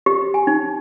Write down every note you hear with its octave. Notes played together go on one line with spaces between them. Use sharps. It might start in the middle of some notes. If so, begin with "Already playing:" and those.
G4
G#5
D#4